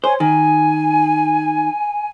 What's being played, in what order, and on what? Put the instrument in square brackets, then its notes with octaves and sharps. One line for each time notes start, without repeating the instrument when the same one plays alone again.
[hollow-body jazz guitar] C5 [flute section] C#5 G#5
[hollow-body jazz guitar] D#3 [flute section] G#5